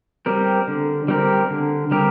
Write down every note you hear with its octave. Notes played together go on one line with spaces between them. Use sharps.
G3 C4 G4 A#4
D3
G3 C4 G4 A#4
D3
G3 C4 G4 A#4